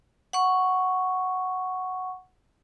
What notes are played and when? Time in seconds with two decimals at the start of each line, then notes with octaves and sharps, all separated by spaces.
0.33 F#5 C#6